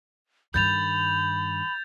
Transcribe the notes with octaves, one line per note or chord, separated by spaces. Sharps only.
G2 D#3 B5 G6 A6 F7